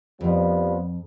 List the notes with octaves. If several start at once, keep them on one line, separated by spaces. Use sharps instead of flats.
F2 F3 G3 B3